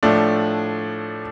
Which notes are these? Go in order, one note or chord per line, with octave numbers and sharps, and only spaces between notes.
A2 F3 A3 D4